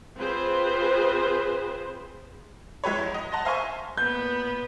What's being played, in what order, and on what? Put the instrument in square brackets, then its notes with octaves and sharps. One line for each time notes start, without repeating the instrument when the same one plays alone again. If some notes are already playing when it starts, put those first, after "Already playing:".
[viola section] C4 F4 G#4 B4 C5
[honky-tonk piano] G#3 E4 G4 B4 C#5
E2
D#5
F#5 A5 A#5 C6 A#6
C5 E5 F5 G#5 C6 C#6
[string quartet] A#2 B3 [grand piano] G6